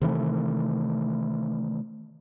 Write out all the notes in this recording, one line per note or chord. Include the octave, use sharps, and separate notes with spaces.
C3 D#3 E3 A3